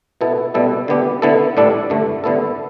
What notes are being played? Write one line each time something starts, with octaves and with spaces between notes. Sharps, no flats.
B2 B3 E4 A4
B2 G3 E4 A4
D3 B3 G4
D3 B3 E4 A4
A2 G3 D4 A4
G2 D3 A3
G2 D3 B3 E4 A4